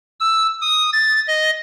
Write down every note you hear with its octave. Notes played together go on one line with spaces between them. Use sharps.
E6
D#6
A6
D#5